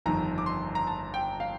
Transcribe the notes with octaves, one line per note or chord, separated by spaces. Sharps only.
G1 F2 D#3 A#5
D6
C6
A#5
A5
G5
F5